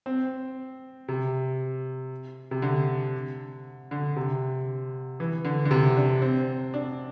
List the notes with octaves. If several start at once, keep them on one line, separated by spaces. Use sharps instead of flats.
C4
C3
C3
D3
D3
C3
E3
D3
D3
C3
D4
C4
D4